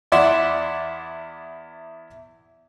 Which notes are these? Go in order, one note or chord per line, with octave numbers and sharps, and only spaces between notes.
E2 E4 D5 E5 F#5 C6